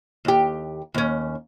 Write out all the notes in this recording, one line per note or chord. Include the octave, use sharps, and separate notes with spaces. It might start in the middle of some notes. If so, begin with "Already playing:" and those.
D#2 G4
D#2 C#4